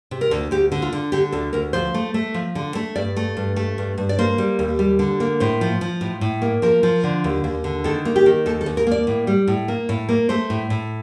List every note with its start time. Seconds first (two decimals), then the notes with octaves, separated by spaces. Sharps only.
0.11 C3
0.21 A#4
0.31 D2
0.51 D2 G4
0.72 D3
0.82 F4
0.93 D3
1.12 D3 G4
1.32 D2 A4
1.53 D2 A#4
1.73 F3 C5
1.94 A3
2.14 A3
2.34 F3
2.55 D3
2.75 A3
2.96 G2 D5
3.16 A3
3.37 G2
3.56 A3
3.78 G2
3.98 G2
4.09 D5
4.19 A#3 C5
4.38 G3
4.59 D#2
4.79 G3
4.99 D3
5.20 A#3
5.40 A2 C5
5.61 F3
5.81 F3
6.01 A2
6.21 A2
6.42 A#3
6.62 F3 A#4
6.83 F3
7.04 D3
7.24 D#2
7.44 D#2
7.64 D3
7.84 D#3 A4
8.05 A#3
8.16 G4
8.26 D#3
8.46 D#2 A4
8.61 A4
8.66 D#2
8.77 A#4
8.87 A#3 D5
9.07 A2
9.27 G3
9.48 A2
9.68 A#3
9.89 A2
10.09 A#3
10.29 A3 C5
10.50 A2
10.70 A2